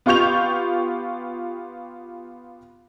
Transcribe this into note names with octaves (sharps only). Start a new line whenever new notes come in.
B3 F4 G4 C#6 G6 F7